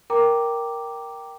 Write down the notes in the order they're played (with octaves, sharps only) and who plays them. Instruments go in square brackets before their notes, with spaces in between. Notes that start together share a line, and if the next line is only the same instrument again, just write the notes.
[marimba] A#4 [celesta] G5 A#5 D6